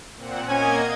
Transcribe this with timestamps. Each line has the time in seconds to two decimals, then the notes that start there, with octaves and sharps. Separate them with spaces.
0.17 A#2 C4 F#5
0.49 A#3 C#4 D#5 G#5 G#6